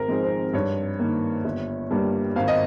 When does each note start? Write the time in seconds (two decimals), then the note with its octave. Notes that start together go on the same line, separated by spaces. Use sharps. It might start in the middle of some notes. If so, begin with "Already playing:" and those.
Already playing: G#1 A#4 C5
0.08 G#2 F3 G#3 C4
0.23 C5
0.53 G2 C#5
0.99 D#3 A#3
1.44 G1
1.91 G2 G3 A#3
2.36 G#1 F5
2.48 D#5